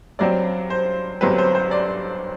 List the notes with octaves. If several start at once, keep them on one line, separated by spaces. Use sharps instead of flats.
G2 F#3 C4 D5
C5
G1 G2 F#3 C4 B4
C5
C5
D5